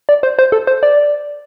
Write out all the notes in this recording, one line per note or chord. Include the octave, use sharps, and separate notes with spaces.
D5
C5
C5
A4
C5
D5